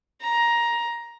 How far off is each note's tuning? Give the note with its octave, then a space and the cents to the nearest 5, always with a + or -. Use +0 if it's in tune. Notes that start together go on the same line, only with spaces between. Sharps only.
A#5 +15